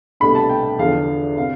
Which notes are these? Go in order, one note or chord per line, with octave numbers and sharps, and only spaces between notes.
C2 B2 A3 D4 B5
A5
G5
E2 D3 F3 F5
C3 F5